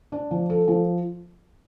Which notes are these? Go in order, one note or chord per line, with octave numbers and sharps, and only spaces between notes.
D4
F3
A4
F3